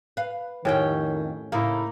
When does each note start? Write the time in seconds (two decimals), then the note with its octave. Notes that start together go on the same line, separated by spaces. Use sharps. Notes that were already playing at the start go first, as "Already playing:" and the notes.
0.17 B4 F5
0.65 F2 A2 D#3 C#4 G4 G5
1.52 A2 C#3 A#3 D#4 E4 F5